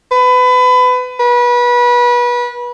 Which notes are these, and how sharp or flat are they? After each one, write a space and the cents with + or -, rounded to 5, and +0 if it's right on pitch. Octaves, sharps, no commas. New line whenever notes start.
B4 +25
B4 -30